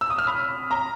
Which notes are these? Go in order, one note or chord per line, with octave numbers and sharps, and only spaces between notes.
E6
D#6
F6
B5
A#5